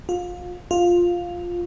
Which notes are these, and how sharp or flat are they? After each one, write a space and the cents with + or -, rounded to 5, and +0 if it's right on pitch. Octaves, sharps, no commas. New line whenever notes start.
F4 +25
F4 +5